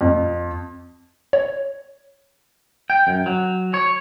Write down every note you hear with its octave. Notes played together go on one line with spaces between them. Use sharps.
F2
C#5
G5
F#2
F#3
C#5